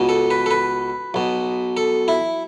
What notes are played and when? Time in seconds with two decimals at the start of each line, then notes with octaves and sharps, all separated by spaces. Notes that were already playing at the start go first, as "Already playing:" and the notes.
Already playing: C#2 B2
0.09 A4
0.31 B4
0.46 A4
0.51 B4
1.14 B1 B2
1.77 A4
2.08 E4